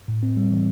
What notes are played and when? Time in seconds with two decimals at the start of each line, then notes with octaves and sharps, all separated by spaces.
0.08 A2
0.23 C4
0.37 G3
0.51 E3